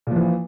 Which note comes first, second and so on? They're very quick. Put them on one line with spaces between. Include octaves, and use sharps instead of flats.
A#2 F3 E3